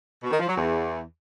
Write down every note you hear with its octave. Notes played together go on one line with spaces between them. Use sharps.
B2
D#3
F3
F#3
E2